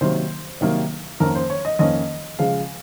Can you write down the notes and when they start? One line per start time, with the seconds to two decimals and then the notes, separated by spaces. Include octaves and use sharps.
0.01 C3 D#3 F#3 A#3 C5
0.61 C3 D#3 F#3 A#3
1.20 F2 D#3 A#3 C#4 A#4
1.35 C5
1.50 C#5
1.65 D#5
1.79 F2 D#3 A#3 C#4 D#5
2.39 C#3 F3 G#3 F5